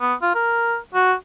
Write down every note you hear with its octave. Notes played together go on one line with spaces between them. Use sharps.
B3
F4
A#4
F#4